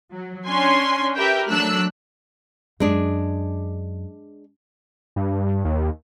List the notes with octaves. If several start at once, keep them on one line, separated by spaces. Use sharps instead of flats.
F#3
C#4 D4 G#5 C6
G4 A#4 B4 E5 G5
F#3 A3 D4 E6 F#6
F#2 G#3 D4 G#4
G2
D#2